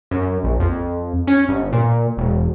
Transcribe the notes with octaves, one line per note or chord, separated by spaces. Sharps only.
F#2
A#1
F2
C#4
G1
A#2
E1